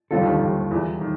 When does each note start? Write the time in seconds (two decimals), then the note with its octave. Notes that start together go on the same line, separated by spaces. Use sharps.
0.11 D3 G3 C4 F4 A4
0.21 D#2 D#3
0.31 D3
0.41 D#2 D#3
0.71 E2 E3
1.01 D#3